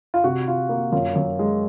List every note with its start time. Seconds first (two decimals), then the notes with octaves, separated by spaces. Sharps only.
0.14 F4
0.24 C3 F#4
0.48 F4
0.69 A#3
0.92 F#2 F4
1.15 F#2
1.39 G#3